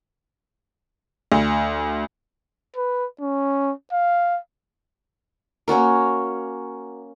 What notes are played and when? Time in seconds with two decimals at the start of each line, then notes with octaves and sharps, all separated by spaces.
1.32 D2
2.76 B4
3.21 C#4
3.92 F5
5.68 A#3 C#4 F#4 A#4